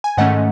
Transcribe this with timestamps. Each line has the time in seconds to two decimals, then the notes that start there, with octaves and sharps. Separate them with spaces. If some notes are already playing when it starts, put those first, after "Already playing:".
0.04 G#5
0.17 G#2 D#3 A3 C#4 D#5 F#5